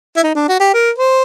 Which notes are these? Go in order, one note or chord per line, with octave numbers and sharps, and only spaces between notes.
E4
D#4
D4
F#4
G4
A#4
C5